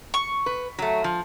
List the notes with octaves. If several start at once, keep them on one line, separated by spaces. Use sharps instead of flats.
C#6
B4
F#3 A3
F3